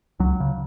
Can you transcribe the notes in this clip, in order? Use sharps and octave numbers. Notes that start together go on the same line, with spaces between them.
C#2 F#3
C#3